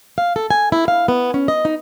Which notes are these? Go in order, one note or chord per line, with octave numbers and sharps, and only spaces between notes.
F5
A4
G#5
E4
F5
B3
C#4
D#5
D#4